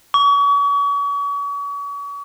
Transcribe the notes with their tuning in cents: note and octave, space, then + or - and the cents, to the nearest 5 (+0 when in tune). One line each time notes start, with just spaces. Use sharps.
C#6 +40